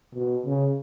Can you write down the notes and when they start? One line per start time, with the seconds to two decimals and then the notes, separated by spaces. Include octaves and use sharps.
0.15 B2
0.46 C#3